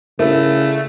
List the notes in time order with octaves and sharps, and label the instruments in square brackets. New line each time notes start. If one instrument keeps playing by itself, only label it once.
[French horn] C#3 [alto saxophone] A3 [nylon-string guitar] E4 [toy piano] A#4